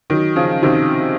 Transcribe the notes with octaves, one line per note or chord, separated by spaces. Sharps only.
D#3 F#3
C#3 F3
C3 D#3